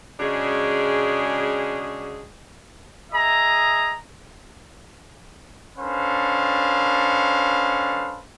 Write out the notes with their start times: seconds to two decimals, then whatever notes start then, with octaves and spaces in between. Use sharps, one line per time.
0.20 C#3 G#3 D4 F#4 G#4
3.12 G#4 D#5 E5 A#5
5.78 C#4 D4 A4 B4 C5 F5